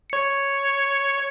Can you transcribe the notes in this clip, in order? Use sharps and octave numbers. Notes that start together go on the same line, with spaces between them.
C#5 C#7